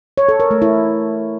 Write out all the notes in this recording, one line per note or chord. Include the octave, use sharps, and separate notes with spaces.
C#5
A4
A#4
A3
E4